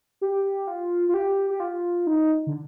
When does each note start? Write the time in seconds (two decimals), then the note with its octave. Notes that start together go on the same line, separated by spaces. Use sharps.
0.21 G4
0.67 F4
1.09 F4
1.14 G4
1.50 G4
1.60 F4
2.07 D#4
2.47 D3